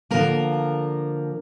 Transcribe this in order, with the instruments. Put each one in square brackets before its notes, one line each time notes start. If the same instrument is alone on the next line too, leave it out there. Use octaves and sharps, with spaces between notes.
[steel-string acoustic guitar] D3 F3 A#3 A#4